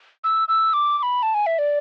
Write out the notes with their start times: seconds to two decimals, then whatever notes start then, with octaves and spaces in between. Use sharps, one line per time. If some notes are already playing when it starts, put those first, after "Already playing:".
0.24 E6
0.48 E6
0.73 D6
0.98 D6
1.03 B5
1.23 A5
1.34 G#5
1.46 E5
1.59 D5